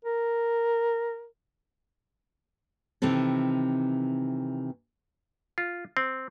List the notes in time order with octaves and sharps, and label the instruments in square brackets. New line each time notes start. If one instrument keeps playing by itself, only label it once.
[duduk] A#4
[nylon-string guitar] C3 D#3 E3 C4 A4
[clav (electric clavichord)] F4
C4